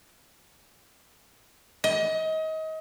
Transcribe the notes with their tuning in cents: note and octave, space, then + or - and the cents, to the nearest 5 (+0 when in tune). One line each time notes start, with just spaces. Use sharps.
D#5 +30